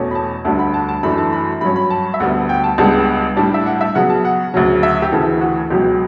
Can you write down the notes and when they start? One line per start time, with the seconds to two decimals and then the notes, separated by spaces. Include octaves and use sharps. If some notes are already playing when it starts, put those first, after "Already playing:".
Already playing: E2 B2 A3 C#4
0.11 B5
0.15 A5
0.45 D2 D3 G3 D4 A5
0.59 B5
0.74 A5
0.89 A5
1.03 F#2 E3 A3 D4 B5
1.18 A5
1.33 B5
1.61 G2 F#3 C#4 B5
1.76 B5
1.90 A5
2.14 E5
2.20 D2 D3 G3 B3 F#5
2.49 G5
2.64 A5
2.78 C#2 C#3 G3 B3 D4 A5
3.37 A2 G3 D4
3.54 E5
3.66 F#5
3.81 E5
3.95 C#3 F#3 B3 F#5
4.10 A5
4.25 F#5
4.54 D2 C#3 F#3
4.83 E5
5.02 G4
5.12 D2 C#3 E3 A4
5.41 F#4
5.70 C#2 B2 F#3 G4